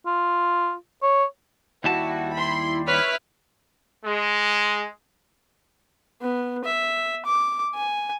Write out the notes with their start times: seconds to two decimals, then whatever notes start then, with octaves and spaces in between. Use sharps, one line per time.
0.06 F4
1.03 C#5
1.84 D#2 G3 E4 F#4 A5
2.34 B5 C6
2.87 E4 B4 C#5 F6 B6
4.04 G#3
6.22 B3
6.65 E5
7.26 D6
7.75 G#5